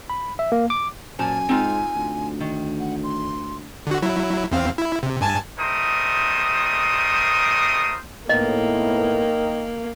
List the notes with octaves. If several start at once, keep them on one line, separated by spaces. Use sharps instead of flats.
B5
E5
A#3
D6
F#2 A#2 C5 G#5 A5
G#2 C4 D#4 F4
D2
D#3
F#5
C6
D3 F#4
F#3 E4
E2 C4 F5
E4
C3
G2 G#5 A5
G3 A3 A#4 C5 D#5 D#6
A2 D#3 A#3 B3 D#5